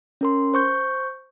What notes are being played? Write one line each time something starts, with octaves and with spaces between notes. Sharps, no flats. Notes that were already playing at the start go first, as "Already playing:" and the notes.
C#4 A#4 C6
C5 C#6 G6